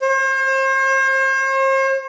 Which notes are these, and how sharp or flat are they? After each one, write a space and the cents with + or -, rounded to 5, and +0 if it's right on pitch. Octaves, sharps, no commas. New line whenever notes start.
C5 +40